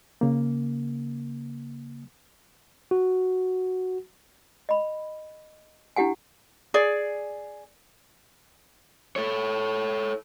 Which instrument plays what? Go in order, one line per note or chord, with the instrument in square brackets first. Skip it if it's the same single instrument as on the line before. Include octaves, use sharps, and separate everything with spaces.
[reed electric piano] C#3 A#3
[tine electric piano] F#4
[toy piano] D#5 B5
D4 E4 G4 F#5 G#5
[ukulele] G#4 D5
[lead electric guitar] A4 C#5